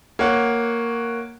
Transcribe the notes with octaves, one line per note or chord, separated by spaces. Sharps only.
A#3 C#5 F#5